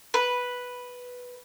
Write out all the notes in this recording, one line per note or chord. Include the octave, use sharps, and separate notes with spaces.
B4